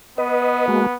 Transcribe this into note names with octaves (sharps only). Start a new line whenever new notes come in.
B3 B4 D#5
G#3 A#3 F#4